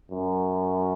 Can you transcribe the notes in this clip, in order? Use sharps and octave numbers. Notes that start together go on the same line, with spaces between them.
F#2